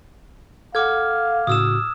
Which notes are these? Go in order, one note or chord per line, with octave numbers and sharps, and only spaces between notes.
A4 F5 F#5 D6 F6 G#6
A2 C#3 F#4 D#6 E6 E7